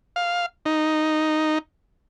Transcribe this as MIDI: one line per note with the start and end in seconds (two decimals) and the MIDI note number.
0.16 0.46 77
0.66 1.58 63